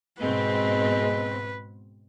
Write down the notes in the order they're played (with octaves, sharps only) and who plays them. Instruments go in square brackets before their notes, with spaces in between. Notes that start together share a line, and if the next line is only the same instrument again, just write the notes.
[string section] G#2 B2 C4 [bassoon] G#3 [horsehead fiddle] B4